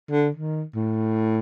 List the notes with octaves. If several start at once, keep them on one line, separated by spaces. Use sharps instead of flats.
D3
D#3
A2